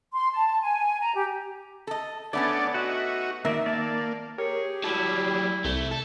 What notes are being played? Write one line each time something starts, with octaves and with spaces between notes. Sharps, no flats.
C6
A5
G#5
A#5
G4
A4 D#5
A3 B3 C#4 D4 A4 D5
D#4 F#4 E5 F#5
D#3 A#3 A#4 D5 E5
A#3 D5 A5
G4 G#4 A#4 C#5
F#3 G3 E4 A5
C2 A3
A4